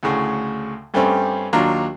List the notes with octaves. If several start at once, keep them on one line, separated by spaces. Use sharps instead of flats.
D2 A2 C#3
G2 G3 A3 C4 C#4
D#2 F#3 D4 F4 A#5